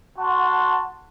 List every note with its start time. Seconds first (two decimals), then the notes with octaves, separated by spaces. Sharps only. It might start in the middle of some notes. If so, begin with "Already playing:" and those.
0.19 F#4 F#5 A5 C6